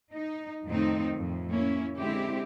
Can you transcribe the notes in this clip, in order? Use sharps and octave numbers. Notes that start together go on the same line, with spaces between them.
D#4
F2 A2 D#3 C4 D#4
F2 A2
A#3 C#4 E4
D3 G#3 C4 E4 G4